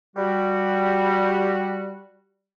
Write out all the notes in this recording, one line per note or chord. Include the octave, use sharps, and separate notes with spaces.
G3 F#4